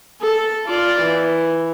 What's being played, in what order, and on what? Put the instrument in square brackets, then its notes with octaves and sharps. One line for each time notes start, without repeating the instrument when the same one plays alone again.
[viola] A4
F4 D5
E3